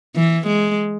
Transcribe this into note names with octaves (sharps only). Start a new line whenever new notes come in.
E3
G#3